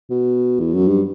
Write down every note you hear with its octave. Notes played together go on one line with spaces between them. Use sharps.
B2
E2
F#2
G2